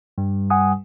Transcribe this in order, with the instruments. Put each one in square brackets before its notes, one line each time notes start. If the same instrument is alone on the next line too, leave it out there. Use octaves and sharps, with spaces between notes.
[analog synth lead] G2
[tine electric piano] F#5 G#5 D#6